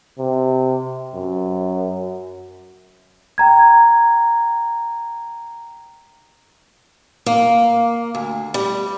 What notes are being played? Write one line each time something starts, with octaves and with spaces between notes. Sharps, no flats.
C3
F#2
G5 A#5 G#6
A#3
D2
G3